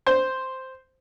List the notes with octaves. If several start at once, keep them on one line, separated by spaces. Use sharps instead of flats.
C5